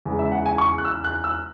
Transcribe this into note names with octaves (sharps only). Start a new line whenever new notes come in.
E2 C#3 G#3
E5
F#5
G#5
C#6
F#6
E6
F#6
E6